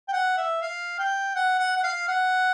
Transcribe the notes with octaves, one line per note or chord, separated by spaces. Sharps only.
G5
F#5
E5
F5
G5
F#5
F#5
F#5
F5
F#5